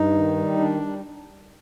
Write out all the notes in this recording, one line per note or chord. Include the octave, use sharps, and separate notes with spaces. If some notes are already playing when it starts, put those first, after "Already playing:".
Already playing: G2 D#4
D#3
G3
D#3 D4
G3